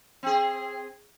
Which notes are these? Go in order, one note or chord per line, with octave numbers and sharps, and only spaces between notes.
C4 G#4